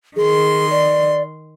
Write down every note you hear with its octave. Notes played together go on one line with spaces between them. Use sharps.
D#3 G#4 C6
D5